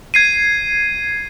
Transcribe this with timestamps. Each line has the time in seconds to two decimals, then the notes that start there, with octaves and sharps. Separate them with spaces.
0.14 G#6 C7 D#7